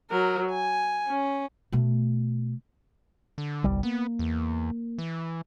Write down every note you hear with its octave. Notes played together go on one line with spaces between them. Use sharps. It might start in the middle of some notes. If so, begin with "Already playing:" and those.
F#3 A#4
G#5
C#4
B2 A3
D3
G1 C2 G3
A#3 B3
E2
E3